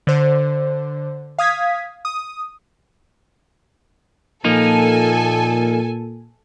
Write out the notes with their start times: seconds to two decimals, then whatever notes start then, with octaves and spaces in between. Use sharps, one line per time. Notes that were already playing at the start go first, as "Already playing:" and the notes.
0.07 D3 C5
1.39 F5 D#6 G#6 B6
2.05 D#6
4.45 A#2 F3 A#3 D#4 A4 G#5